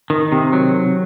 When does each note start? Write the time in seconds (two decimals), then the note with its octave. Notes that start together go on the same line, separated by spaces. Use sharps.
0.10 D#3
0.32 C3
0.53 F#3